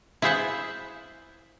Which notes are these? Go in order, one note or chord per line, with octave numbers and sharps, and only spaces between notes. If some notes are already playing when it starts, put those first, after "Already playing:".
E4 F4 G#4 C5 E5 F#5